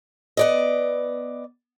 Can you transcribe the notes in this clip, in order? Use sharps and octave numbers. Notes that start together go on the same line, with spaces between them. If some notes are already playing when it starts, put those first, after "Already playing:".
B3 D5 D#5